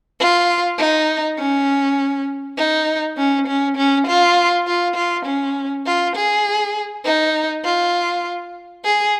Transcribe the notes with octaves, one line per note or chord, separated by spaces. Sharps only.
F4
D#4
C#4
D#4
C#4
C#4
C#4
F4
F4
F4
C#4
F4
G#4
D#4
F4
G#4